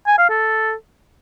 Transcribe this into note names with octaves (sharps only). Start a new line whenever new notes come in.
G#5
F5
A4